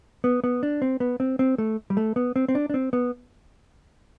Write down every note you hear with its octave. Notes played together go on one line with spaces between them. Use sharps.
B3
B3
D4
C4
B3
C4
C4
A3
G3
A3
B3
C4
C4
D4
D4
C4
B3